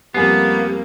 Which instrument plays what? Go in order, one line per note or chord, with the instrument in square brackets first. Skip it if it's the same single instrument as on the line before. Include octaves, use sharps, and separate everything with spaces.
[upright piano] F2 G#5 C7 [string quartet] G3 A#3 [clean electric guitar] B3 [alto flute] G4